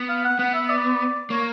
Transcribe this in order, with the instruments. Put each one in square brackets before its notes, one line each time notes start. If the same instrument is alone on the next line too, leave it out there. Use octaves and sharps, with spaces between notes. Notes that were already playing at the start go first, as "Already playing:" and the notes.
Already playing: [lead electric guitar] B3
[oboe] F5
F#5
[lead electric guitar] B3 [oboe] F#5
[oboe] E5
D5
[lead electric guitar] A#3 [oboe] C#5